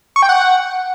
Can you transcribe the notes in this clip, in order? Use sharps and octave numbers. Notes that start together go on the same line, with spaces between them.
C#6
G5
F#5